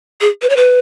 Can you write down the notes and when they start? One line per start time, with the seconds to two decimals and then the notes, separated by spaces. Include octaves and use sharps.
0.21 G#4
0.42 B4
0.50 C#5
0.57 B4